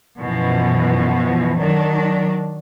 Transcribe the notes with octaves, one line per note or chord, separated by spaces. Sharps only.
F#2 B2 E3 F3
D#3 F#3 D4